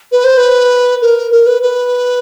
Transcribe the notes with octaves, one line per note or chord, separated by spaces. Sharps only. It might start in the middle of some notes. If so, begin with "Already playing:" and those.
B4
C5
B4
A#4
A#4
B4
B4